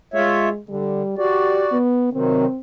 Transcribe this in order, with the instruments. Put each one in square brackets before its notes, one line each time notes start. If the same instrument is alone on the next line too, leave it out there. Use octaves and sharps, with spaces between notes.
[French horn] G#3 [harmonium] F4 C#5 E5
[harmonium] D3 [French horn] G3
[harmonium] F#4 D5 [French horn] G4
[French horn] B3
[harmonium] C3 D#3 F#3 [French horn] C4